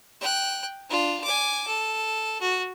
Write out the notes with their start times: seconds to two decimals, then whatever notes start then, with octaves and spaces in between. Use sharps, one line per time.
0.21 G5 F#6
0.89 D4 F4
1.24 G#5 D6
1.67 A4
2.41 F#4